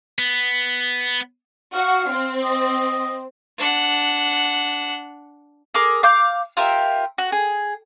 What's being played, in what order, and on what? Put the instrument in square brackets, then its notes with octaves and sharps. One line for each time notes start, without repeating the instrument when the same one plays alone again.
[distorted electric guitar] B3
[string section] F#4 [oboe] F5
[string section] C4
[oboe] D#5
[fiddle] D4 F#5
[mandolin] G#4 A#4 D6
F5 D6 G6
F4 G4 A#4 E5
F#4
G#4